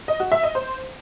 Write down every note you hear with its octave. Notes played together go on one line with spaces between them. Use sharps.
D#5
F#4
E5
D#5
C5